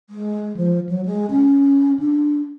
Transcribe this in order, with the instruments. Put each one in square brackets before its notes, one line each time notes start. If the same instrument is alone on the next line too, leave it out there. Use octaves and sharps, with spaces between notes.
[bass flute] G#3
F3
F#3
G#3
C#4
D4